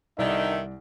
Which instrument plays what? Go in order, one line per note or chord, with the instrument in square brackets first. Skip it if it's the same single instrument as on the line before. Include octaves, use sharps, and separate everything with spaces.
[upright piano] C2 D5 [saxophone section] D3 D#3 [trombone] D#4 [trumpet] E5